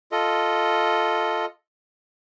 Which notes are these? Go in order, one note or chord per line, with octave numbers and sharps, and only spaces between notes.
F4 A4 D#5